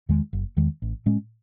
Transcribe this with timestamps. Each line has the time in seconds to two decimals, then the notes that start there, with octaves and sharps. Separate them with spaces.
0.09 E2 D#3 G#3
0.33 F#1
0.57 E2 D#3 G#3
0.82 A1
1.06 A2 G#3 C#4